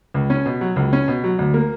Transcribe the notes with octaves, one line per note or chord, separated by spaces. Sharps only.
C#2
C#4
B2
F#3
C#2
C#4
B2
F#3
D2
A#3